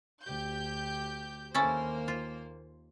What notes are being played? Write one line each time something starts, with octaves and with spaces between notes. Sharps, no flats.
D2 G4 G6
D#2 A#3 C#4 E4 A4 C5
F4